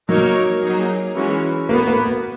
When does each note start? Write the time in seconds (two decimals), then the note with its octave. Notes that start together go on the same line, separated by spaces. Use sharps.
0.09 F#3 A#3 D#4 A#4 C#5
0.62 F#3 A#3 D#4 G#4
1.16 E3 G#3 C#4 F#4
1.69 A#3 B3 F#4 B4
1.87 A#3
2.05 B3